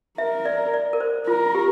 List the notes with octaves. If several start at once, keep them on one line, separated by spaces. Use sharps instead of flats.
A#4 E5
D5
D5
A#4
C5
F4 A#4
G4